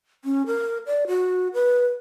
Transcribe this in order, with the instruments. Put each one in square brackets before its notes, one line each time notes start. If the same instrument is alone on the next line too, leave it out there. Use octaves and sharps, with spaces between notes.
[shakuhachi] C#4
A#4
D5
F#4
B4